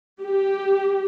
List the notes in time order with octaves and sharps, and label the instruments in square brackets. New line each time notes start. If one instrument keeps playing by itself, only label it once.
[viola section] G4